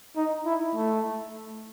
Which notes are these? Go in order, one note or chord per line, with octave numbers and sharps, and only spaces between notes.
D#4
E4
A3